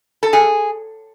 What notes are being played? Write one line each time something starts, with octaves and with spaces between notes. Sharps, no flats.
A4
F#2 G#4